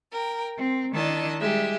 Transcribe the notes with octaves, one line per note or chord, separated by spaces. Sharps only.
A#4 G5
C4
D#3 D4 E4 D#5 A5
G3 G#3 G4 E5